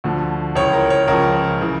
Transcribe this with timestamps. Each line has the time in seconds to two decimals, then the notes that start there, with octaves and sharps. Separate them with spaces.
0.04 D2 D3 F3
0.56 C#2 C#3 E3 C#5
0.73 A#4
0.90 C#5
1.08 C#2 C#3 F3 A#4
1.61 C#3 E3